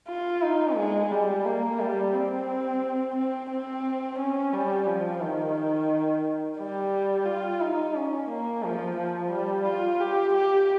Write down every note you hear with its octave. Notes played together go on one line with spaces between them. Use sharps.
F4
D#4
G#3
G3
A#3
G3
C4
C4
C4
C#4
G3
F3
D#3
G3
F4
D#4
C#4
A#3
F3
F3
G3
F4
G4
G4